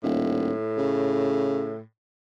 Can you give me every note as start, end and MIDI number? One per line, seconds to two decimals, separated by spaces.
0.04 0.52 27
0.04 1.82 45
0.77 1.72 49